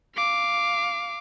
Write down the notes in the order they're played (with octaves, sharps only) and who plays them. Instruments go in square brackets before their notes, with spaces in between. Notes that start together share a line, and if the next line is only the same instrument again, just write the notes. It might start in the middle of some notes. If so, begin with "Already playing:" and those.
[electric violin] F5 D6